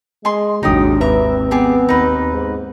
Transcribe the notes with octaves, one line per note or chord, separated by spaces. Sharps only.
G#3 G#4 D#5 C6
G#1 D#2 F#3 D4 D#4 G4 D#6
C4 B4 E5 A#5
B3 G4 G#4 D5
D#2 D#4 B4
G#2